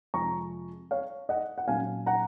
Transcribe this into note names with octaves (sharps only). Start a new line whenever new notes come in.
F2 C3 F3 G#3 A#5 C#6
C#5 F5
D#5 F#5
F#5
A#2 F#3 C#4 F5 G#5
F#5 A#5